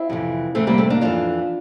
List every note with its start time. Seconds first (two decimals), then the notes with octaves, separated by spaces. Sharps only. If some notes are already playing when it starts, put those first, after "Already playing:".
Already playing: C4 E4
0.09 F2 C3 E3
0.55 F2 C3 E3 A3 C4
0.67 G3 A#3
0.78 A3 C4
0.90 A#3 D4
1.01 F2 E3 D4 F4